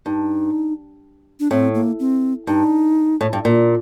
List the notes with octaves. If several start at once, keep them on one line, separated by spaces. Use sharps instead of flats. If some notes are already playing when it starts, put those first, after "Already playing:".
G2 D#4
D4
A2 C4
A#3
C4
G2 D#4
A2
G2
A#2